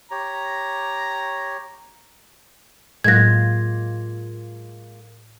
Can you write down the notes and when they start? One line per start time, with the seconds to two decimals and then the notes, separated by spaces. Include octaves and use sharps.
0.11 G4 C#5 A#5
3.04 A2 F#3 G#3 A#3 F4 F#6 G#6 A#6